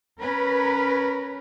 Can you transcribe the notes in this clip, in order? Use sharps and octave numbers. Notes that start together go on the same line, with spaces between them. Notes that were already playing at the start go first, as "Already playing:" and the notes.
C#4 A#4 B4